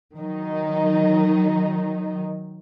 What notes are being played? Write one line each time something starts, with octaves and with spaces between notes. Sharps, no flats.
D#3 F#3 D#4